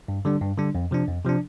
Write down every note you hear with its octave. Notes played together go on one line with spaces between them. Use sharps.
G2
D3 G3 D4
G2
D3 G3 D4
F2
C3 F3 D4
F2
C3 F3 D4